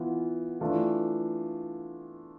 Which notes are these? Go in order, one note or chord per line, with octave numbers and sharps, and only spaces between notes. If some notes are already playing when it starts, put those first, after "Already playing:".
Already playing: E3 B3 F4
E3 A3 D4 F4